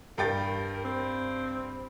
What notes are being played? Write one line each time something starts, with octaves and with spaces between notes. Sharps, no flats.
G2 A#4 G5 A6
C4